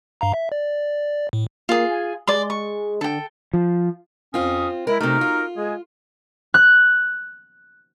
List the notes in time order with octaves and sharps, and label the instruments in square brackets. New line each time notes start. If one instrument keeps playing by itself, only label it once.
[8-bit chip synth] G2 F5 A#5
E5
D5
A2
[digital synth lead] A#3 [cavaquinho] F4 G#4
[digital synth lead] G#5
[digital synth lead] G#3 [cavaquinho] D5 C6
[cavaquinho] C#6
[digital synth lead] D3 [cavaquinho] A4 G5
[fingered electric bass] F3
[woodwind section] F2 C#4 D#6 [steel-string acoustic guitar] C4 F4
[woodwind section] G#3 E4 [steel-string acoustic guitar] A#4
[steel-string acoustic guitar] C3 A3 [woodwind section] D#4 F#4 A#4
[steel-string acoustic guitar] F4
[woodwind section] G#3 G#4
[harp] F#6